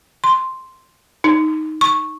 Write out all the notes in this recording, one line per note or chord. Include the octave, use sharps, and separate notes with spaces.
C6
D#4
C#6